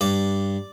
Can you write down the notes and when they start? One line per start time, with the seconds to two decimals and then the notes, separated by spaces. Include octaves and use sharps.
0.01 G2 D5